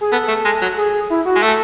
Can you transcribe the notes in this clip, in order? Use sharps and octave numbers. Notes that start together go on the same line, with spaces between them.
G#4
B3 A4
A3
G#3
F#3
G#4
E4
F#4
G#3
A3 A4